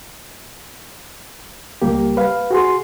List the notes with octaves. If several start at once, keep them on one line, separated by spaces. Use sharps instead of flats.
C#2 G3 A#3 G4
B4 F5
F#4 G#4 C6